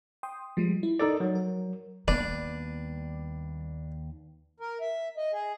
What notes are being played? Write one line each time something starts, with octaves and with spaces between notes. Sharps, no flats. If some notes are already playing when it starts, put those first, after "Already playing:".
G5 C6 D#6
F3 G3 G#3
E4
D#4 A4 A#4 D5
F#3
A#4
D#2 G3 B3 D4 B4 D5
A#4
E5
D#5
G#4